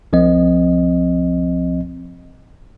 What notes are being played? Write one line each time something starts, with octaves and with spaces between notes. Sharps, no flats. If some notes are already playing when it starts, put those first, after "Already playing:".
C2 F3 C4 D#5